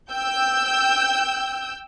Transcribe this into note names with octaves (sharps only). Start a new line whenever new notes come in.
G5 E6 G6